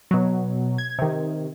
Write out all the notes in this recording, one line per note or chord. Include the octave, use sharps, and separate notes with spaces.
B2 F#3
G#6
C3 D#3